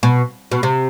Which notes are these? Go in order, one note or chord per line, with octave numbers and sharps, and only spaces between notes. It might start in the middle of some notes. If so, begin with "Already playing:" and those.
B2
B2
C3